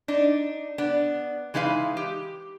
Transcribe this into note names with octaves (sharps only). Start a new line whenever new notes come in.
D4 D#4
B3 D4
E3 G#3 D#4 B4 F5
G4